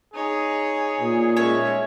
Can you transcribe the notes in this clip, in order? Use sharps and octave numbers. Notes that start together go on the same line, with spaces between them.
D#4 G#4 C#5
A#2
G#3 C#4 C#5 E5